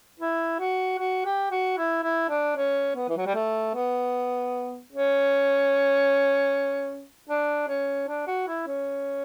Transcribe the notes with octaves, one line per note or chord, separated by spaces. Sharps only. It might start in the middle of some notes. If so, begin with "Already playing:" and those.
E4
F#4
F#4
G4
F#4
E4
E4
D4
C#4
B3
E3
F#3
G3
A3
B3
C#4
D4
C#4
D4
F#4
E4
C#4